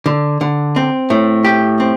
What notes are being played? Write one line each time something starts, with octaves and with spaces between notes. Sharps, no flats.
D3
D3
C4
A2
G4
C4